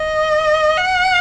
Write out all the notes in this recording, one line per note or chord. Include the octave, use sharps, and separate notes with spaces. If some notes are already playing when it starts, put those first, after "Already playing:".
Already playing: D#5
F#5